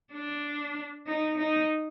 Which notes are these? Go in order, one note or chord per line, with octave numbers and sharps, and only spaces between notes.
D4
D#4
D#4